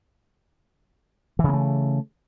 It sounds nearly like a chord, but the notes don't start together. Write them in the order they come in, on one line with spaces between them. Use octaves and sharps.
E3 C#3 A#3 A3